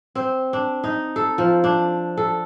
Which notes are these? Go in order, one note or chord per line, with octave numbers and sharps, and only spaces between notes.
C4
D4
D#4
A4
F3
D4
A4